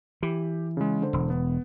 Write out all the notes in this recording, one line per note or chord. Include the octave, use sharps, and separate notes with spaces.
E3 G4
C#3 G#3
D3 C5
E1
B3